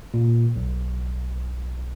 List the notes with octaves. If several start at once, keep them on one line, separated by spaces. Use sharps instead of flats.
A#2
B1